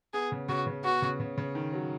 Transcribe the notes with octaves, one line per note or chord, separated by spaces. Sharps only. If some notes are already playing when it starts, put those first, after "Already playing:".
B3 G#4
C#3
C#3 F#4
C#3
B3 F#4
C#3
C#3
C#3
D#3
F#3